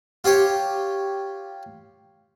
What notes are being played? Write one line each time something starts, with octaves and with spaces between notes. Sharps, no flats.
F4 G4 C#5